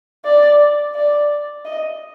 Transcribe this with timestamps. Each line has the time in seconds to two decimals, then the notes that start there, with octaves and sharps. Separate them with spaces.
0.25 D5
0.95 D5
1.65 D#5